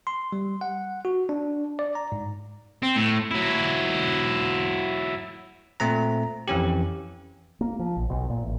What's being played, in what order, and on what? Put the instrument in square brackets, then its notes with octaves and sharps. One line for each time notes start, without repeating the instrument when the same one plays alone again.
[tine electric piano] C6
G3
F#5
F#4
D4
D5
A#5
G#2
[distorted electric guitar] C4
A2
F#3 E4
[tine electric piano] A#2 A3 C4 A#5
F2 E3 C#4 G4
[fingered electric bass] A#3
F3
A#1
B1
A#2
A1